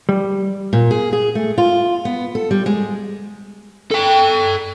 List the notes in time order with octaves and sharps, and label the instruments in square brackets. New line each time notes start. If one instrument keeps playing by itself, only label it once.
[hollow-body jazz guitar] G3
[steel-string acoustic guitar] A#2
G#4
G#4
A3
F4
B3
A4
G3
G#3
[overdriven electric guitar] A4 G5